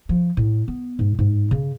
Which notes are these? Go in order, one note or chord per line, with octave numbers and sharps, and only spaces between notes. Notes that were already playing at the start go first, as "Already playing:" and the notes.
F3
A2
B3
G#2
G#2
C#3